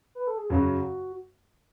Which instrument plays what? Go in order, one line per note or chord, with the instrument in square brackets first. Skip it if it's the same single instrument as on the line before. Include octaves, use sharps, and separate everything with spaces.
[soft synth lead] B4
A4
G#4
[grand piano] F#2 C#3 F#3 [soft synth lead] F#4